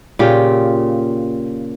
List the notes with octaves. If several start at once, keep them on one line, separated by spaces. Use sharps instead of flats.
A#2 C#3 F4 G4